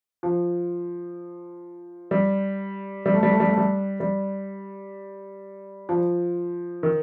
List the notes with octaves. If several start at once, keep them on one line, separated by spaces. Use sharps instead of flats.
F3
G3
G3
A3
G3
A3
G3
A3
G3
G3
F3
D#3